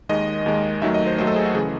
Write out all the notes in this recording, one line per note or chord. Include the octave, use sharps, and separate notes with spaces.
D#2 D#3 G#3 D#5
D#2 D#3 G#3
D#2 D#3 F#3 A3 E5
D#5
C5
D#2 D#3 F#3 A3 C5
A4
G#4
F#4
C#3 E3 G#4